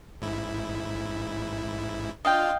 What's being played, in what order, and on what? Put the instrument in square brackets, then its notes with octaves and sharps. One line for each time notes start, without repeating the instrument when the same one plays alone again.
[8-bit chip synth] A1 G#2 E4
[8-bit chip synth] D4 F4 [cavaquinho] D#5 F5 G5